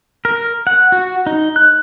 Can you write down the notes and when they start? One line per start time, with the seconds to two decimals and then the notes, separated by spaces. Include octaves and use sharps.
0.25 A#4
0.67 F#5
0.92 F#4
1.27 D#4
1.56 F#6